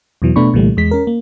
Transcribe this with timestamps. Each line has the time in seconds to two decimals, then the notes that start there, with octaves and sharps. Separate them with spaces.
0.22 E2 B2 E3 F#3
0.36 B2 A3 B3 D4 B5 C#6
0.53 C2 A#2 D3 E3 G3 A3
0.77 E2 G#3 B6
0.91 C#4 A#4
1.07 A#3